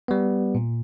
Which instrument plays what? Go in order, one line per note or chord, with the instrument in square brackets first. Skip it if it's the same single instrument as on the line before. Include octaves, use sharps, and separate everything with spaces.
[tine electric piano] G3 B3
A#2